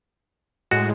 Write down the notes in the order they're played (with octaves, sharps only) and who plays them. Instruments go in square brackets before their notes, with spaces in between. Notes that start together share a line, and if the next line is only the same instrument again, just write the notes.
[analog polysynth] A2 G#3 [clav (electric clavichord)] F#4